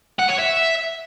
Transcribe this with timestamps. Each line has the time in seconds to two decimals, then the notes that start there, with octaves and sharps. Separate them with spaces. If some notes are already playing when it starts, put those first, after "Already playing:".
0.19 F#5
0.29 C#5
0.38 E5